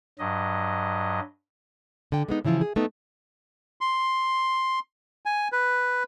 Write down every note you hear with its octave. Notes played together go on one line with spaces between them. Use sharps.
G2 F#3 D#5
D3 G5
G#3 B3 D#4
C#3 E3 F3 E4 F4
G#4
A3 B3 D#4
C6
G#5
B4